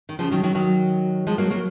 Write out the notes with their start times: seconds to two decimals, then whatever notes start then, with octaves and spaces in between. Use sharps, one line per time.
0.09 D#3
0.19 C#3 F3
0.31 D#3 F#3
0.43 D#3 F#3
0.55 D#3 F#3
1.27 F3 G#3
1.38 F#3 A#3
1.50 F#3 A#3